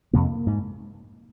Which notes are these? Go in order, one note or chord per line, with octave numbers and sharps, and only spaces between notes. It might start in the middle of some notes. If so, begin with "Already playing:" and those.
F2 C3 A#3
G#2